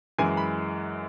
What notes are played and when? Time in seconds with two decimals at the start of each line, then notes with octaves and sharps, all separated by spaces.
0.19 F#2 E3 G#3 G#5
0.37 B5